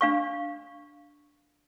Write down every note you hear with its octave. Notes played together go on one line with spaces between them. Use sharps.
D4 F5 C#6